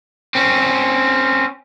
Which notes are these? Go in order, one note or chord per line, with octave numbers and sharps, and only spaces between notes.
C4 C#4